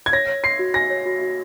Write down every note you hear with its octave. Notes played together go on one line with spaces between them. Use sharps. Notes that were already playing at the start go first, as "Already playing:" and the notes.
G#6
C#5 A#6
C#5
C6 C7
F#4
G#5 A#6
C#5
F#4
F#4